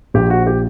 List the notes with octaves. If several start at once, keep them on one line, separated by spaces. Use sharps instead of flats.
A#1 A#2 F3 G4
F#4
G4